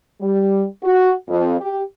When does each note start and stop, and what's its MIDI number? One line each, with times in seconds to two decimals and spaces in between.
0.21 0.64 55
0.83 1.12 66
1.29 1.58 41
1.60 1.82 67